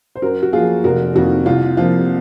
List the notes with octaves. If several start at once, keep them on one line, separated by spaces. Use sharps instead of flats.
C5
F#2 F#4 A#4
F#4
F3 A#3 F4 G#4
F1 F#4 A#4
F2 D#3 A#3 F#4
C2 F4
C3 F3 A#3 F4